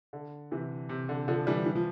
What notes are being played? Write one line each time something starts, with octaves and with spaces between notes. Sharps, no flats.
D3
C3 E3
C3
D3
D3 F3
E3 G3
E3
F3